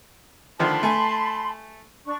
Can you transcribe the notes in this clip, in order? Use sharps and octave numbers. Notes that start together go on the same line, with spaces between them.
D3 D#3 F3 A5 B5 C6
A3 G#5
D4 C#6